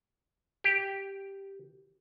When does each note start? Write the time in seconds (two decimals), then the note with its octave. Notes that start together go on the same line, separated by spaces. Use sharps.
0.64 G4